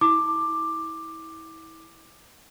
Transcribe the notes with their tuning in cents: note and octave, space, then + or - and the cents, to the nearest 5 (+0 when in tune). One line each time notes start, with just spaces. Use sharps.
E4 -30 D6 +10